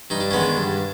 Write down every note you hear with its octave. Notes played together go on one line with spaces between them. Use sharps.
G2 D#4
D4
D#3 G#3 B3 C#4
D4
G2